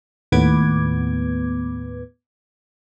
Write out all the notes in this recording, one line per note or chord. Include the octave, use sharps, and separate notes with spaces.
D#2 A2 B3 B4 D6 G#6